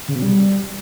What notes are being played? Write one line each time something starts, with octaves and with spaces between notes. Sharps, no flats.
C#3
B2
G3